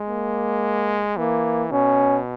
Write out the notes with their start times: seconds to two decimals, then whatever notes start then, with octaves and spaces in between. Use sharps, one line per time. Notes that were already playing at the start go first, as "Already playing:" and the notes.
Already playing: G#3
0.08 A#3
1.17 E3 A#3
1.71 B2 C#4